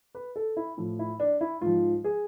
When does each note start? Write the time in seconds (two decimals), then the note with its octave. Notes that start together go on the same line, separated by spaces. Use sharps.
0.15 B4
0.36 A4
0.57 E4
0.78 A2 F3
0.99 E4
1.20 D4
1.41 E4
1.61 G#2 F3 F4
2.04 G#4